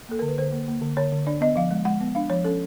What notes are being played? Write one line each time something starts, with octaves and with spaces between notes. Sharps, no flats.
A#3 A4
D3 A#4
B4
D3 C5
A#3
A#3
D3
D3 C#5
D3
D4 D5
B3 D#5
F3 F5
G#3
G#3 F#5
B3
D4 F5
F3 C#5
C#4 A4